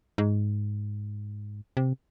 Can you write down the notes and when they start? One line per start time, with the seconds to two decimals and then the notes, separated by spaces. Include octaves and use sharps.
0.18 G#2
1.77 C3